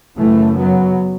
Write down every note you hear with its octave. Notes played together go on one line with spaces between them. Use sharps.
F#2 C#3 E3 A3
F#3 B3